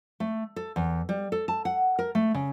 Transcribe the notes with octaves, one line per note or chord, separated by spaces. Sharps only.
A3
A4
E2
G3
A4
A5
F#5
A#4
A3
C#3